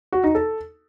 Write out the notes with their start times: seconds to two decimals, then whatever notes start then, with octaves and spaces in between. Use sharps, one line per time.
0.12 F#4
0.24 D#4
0.35 A4